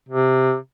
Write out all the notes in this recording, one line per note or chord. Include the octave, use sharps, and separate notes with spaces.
C3